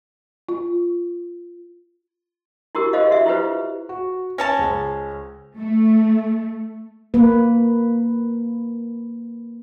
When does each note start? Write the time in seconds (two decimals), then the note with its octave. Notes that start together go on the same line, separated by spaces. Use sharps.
0.49 F4
2.75 E4 F#4 G4 A#4
2.93 G4 G#4 C5 D#5 F5
3.11 F#4 E5
3.26 E4 F4 G4 B4 C5
3.89 F#4
4.38 C#4 C#5 A5 A#6
4.57 C#2 C5
5.57 A3
7.14 A#3 B4